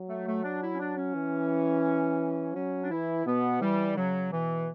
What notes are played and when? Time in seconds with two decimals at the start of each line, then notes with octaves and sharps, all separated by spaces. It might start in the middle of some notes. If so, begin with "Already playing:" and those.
Already playing: F#3
0.09 A3
0.27 A3
0.44 D4
0.62 E4
0.75 C#4
0.79 D4
0.96 C#4
1.14 E3
2.55 F#3 C#4
2.83 D4
2.91 E3 E4
3.26 B2 B3
3.61 E3 G3
3.97 C#3 F#3
4.32 B2 E3